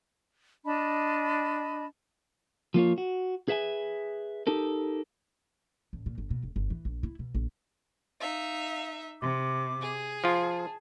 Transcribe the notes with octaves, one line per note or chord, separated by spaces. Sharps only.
D4 D#5 A5 B5
F3 A#3 F4 C#5
F#4
G#4 B4 E5 F#5 G#5
D#4 G4 A4 A#4
A1
A#2
G1
B2
E1
G1
E3
A#1
E4
B2
A#1
D#4 E5 F5
C3 D6
G#4
F3 F4 A5